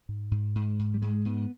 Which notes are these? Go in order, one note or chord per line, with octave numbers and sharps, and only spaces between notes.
G#2
G#2
G#2
G#2
G3
G#2 G#3
G#2 B3